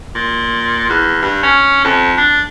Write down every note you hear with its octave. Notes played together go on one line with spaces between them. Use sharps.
A#2
E2
G2
C#4
F2
D4